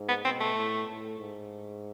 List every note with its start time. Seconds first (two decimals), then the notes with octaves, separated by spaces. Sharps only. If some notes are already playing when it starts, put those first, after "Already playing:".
Already playing: G#2
0.08 B3
0.25 B2 C4
0.40 A3
0.56 A2
0.87 A2
1.19 G#2